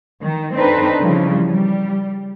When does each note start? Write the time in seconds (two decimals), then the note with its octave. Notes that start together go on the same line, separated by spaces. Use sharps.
0.22 D#3
0.54 C4 D4 D#4 A4 B4
1.01 C#3 E3 F3 G3
1.49 G3